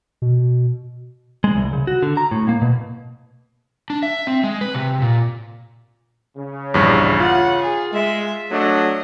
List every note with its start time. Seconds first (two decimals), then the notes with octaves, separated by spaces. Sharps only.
0.22 B2
1.44 G#3
1.57 C2
1.73 C#3
1.87 F#4
2.03 D3
2.17 A#5
2.31 A2
2.49 A#3
2.62 B2
3.90 D4
4.03 E5
4.27 C4
4.44 G#3
4.61 B4
4.75 C3
5.02 A#2
6.37 C#3
6.74 A#1 E2 G2
7.20 F4 F#5
7.62 G#4
7.92 G#3 E5
8.51 F#3 A3 D4 D#5